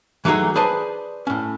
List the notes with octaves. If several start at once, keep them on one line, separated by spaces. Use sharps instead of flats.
E3 F#3 A3 D#4 G#4
G#4 B4 C5 D5 G#5 A5
A2 C#4